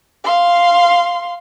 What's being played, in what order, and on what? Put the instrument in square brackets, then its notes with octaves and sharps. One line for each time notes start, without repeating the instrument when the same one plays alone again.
[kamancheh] F5 C6